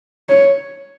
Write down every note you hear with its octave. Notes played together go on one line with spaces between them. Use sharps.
C#5